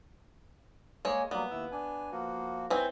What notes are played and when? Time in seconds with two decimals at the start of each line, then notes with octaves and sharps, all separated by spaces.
1.05 G#3 A#3 C#5
1.31 F#3 G3 A#3 B3
1.51 D#2 E4 E6
1.72 D4 G#5
2.12 F3 A#3 F#4
2.70 E3 C4 C#5 E5